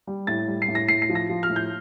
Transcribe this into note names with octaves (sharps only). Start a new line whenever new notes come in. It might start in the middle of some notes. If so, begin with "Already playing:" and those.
G3
A2 A6
G3
C7
A2
A#6
A2 C7
C7
F3
A#6
F3
F6
A2
G6